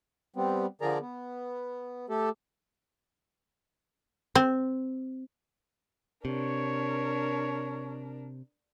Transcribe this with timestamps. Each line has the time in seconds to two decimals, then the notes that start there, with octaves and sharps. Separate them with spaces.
0.36 G3 B3 C4
0.81 D3 F3 G#4 A#4 D5 A#5
1.01 B3
2.09 A3 G4 A4
4.35 C4
6.25 C3 D4 A#4 C#5